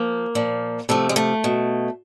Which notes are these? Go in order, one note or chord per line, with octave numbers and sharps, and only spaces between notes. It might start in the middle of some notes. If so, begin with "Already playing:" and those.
Already playing: F3 A#3
A#2 F3
C3 F3 A3
G#3
A3
B2